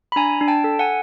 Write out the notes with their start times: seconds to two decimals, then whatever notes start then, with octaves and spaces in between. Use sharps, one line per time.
0.12 B5
0.16 D4 G#5 A#5
0.41 D4
0.48 G5 A5
0.64 A4
0.79 F#5 G#5